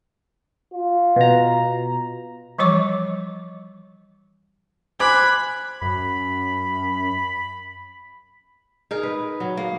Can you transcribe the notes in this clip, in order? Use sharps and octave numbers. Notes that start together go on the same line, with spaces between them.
F4
B2 A#5
E3 F3 G3 C#5 C#6 D6
C5 G#5 B5 D6 F#6 G#6
F#2 B5
D#4 G#4 A#4
B4
F#3
A#3